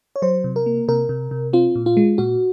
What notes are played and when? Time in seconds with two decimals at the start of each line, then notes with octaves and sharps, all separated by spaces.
0.16 C#5
0.22 F#3 C5
0.44 C3
0.56 A#4
0.66 A#3
0.88 C3 A#4
1.09 C3
1.31 C3
1.53 C4 F4
1.75 A#2
1.86 F4
1.97 G#3
2.18 A#2 F#4